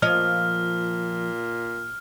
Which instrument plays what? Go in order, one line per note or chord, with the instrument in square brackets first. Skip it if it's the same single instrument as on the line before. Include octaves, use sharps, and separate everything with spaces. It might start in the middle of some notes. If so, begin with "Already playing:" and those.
[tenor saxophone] A#2 [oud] F3 C#5 D#5 [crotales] F6